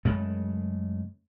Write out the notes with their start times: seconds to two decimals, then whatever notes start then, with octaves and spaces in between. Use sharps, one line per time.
0.05 F#2 C#3 G#3 A3